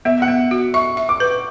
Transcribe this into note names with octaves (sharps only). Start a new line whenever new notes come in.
B3 E5
F#5
B3
F#4
E5 C#6
E5
D6
B4